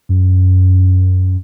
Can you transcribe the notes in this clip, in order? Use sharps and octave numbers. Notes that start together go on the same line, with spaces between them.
F#2